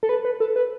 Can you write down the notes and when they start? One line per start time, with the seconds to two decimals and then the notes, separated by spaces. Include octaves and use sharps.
0.03 A4
0.09 B4
0.25 B4
0.40 A4
0.56 B4